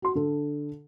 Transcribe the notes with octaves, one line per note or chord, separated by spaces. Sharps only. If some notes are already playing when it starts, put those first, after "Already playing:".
F#4 C6
D3 A4